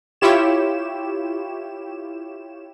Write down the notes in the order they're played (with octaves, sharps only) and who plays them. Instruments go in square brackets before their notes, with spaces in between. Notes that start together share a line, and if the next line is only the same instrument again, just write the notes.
[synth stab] E4 F4 G4 C#5 E7